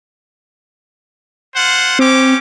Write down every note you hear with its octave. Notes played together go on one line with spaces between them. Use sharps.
F4 C5 F#5
C4 C#4 G4 D6